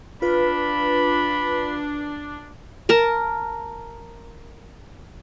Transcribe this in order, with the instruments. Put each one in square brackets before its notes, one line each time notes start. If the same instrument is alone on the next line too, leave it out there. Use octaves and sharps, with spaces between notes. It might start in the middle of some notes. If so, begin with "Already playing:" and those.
[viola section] D4 [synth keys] F4 B4 [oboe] B5
[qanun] A#4 A5 A#5